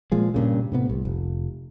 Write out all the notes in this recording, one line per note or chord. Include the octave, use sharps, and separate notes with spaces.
A#2 F3 G#3
G2 A#2 C#3
A2 C3 B3
C2
F1